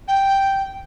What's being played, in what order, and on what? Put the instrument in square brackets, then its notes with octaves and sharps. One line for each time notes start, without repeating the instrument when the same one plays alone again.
[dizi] G5